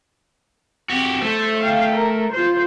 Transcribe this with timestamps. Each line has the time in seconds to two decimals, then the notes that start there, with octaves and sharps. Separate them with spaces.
0.89 C4 F#4 G4
1.22 A3 C5
1.60 F5 G5
1.96 A#4
2.32 F4 C5